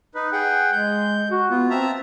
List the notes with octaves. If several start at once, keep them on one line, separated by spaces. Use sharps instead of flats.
D#4 B4
G#4 F#5 G5
G#3 G6
F#4
B3 F4
C4 E5 A5 A#5